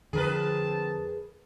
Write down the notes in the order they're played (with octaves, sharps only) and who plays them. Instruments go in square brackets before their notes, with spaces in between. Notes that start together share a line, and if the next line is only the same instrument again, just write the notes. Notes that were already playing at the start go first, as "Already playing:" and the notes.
[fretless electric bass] F2 D3 [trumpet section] C4 A5 [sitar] G#4 A#4 B4